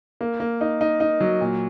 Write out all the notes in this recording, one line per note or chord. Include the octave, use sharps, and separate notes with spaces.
A#3
A#3
D#4
D#4
D#4
F#3
A#2